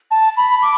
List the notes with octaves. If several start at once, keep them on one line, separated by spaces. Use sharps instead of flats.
A5
B5
D6